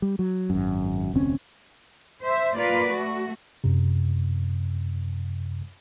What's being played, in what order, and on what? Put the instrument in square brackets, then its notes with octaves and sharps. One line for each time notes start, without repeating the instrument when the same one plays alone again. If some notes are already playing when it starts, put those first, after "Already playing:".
[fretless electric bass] G3
F#3
G#1 F#2
F1 D2 C4 C#4
[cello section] C5 E5
A#3 F4 B4 D5
A3 F#4
[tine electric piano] F#2 C3